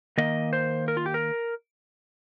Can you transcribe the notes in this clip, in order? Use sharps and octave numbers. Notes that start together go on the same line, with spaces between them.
D#3 A#3 D#5
C5
A#4
F4
G4
A#4